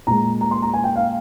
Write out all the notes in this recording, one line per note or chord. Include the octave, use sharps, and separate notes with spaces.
A#2 G#3 A#5
A#5
C6
A#5
G#5
G5
F5